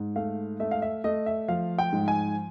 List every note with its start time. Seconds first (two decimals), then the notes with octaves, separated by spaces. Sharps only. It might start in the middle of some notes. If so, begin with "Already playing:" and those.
Already playing: G#2
0.16 A3 F5
0.60 A3 E5
0.71 F5
0.82 E5
1.04 A3 D#5
1.26 E5
1.48 F3 F5
1.78 G5
1.93 G#2
2.08 G#5